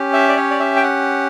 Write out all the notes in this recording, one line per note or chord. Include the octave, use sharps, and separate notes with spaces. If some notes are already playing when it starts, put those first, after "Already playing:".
Already playing: C#4 G4
E5
D5
C#5
D5
E5
G5
F#5